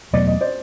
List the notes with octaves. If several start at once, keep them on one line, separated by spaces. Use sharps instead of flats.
E2 B2 F#3 A3 D5
D#5
C5 D5